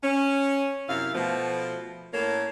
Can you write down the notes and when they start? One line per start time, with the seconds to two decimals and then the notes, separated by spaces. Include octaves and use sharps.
0.03 C#4
0.88 F#2 C3 E4 F5
1.14 B2 F3 A3
2.13 A2 A#3 C#4 A4 A#4 C#5